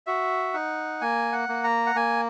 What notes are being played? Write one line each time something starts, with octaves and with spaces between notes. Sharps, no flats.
F#4 E5
D#4 F#5
A#3 G#5
F#5
A#3
A#5
F#5
A#3 G#5